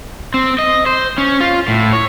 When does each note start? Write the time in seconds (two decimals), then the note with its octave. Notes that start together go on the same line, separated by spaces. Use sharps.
0.34 C4
0.58 D#5
0.86 C5
1.18 C#4
1.40 F4
1.68 A2
1.93 C#5